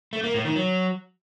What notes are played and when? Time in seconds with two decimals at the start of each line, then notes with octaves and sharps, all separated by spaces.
0.13 A3
0.24 A#3
0.34 A2
0.45 D#3
0.56 F#3